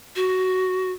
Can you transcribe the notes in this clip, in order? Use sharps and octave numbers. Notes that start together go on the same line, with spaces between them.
F#4